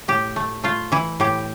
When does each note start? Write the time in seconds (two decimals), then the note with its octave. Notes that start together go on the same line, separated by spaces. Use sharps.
0.08 A2 G4
0.36 A3
0.63 A3 F4
0.92 E3 E4
1.20 A2 G4